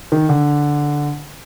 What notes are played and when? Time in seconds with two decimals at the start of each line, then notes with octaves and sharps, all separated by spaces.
0.12 D#3
0.29 D3